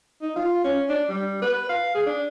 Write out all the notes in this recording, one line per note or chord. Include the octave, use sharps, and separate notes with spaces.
D#4
F4
C#4
D4
G3
B4
F5
G#4
D4